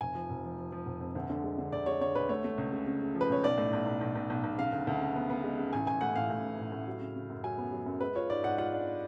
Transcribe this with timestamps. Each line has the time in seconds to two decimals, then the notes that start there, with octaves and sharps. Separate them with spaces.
0.01 F1 G#5
0.15 F3
0.30 F1
0.44 F3
0.58 F3
0.72 F3
0.86 F1
1.01 F2
1.15 D2
1.30 D3
1.44 G#3
1.58 D3
1.72 D2 D5
1.86 G#3 C#5
2.01 D3 C#5
2.15 D2 B4
2.29 A3 C#5
2.44 A3
2.58 C#2
2.72 C#3
2.86 C#3
3.01 C#3
3.15 F3
3.21 B4
3.30 C#2 C#5
3.43 B1 D5
3.58 A2
3.73 B1
3.86 B1
4.01 B1
4.15 B1
4.30 B1
4.44 B1
4.58 C#3 F5
4.73 D2
4.87 D2
5.01 C#3
5.16 B3
5.30 B3
5.44 G#3
5.59 C#3
5.73 A1 G#5
5.87 A1 G#5
6.01 A2 F#5
6.16 A1 F5
6.30 A2
6.44 A1
6.59 A1
6.72 A2
6.87 F#3
7.01 C#3
7.15 C#3
7.30 F#2
7.44 F#3 G#5
7.58 B3
7.73 F#3
7.86 F#2
8.01 G#3 B4
8.15 F4 C#5
8.30 G#2 D5
8.43 G#2 F#5
8.58 F4 F#5
8.73 D4